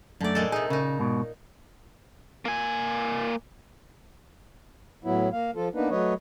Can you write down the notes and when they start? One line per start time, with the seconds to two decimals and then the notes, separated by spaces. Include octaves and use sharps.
0.20 F#2 D3 A3 D5
0.35 A#2 G#3 A4
0.52 C3 D#4 G#4
0.70 A#2 C#3 D#4
0.99 G#2 B2
2.45 A#3 G#5
5.05 A2 F#3 B3 E4
5.32 A#3 F5
5.56 F3 F4 A4
5.75 A#3 B3 D4 D#4 B4
5.90 F#3 A3 B4 C#5 D#5